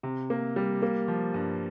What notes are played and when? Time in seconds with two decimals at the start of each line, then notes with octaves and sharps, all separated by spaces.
0.03 C3
0.30 A#3
0.56 G3
0.82 A#3
1.08 F3
1.34 G2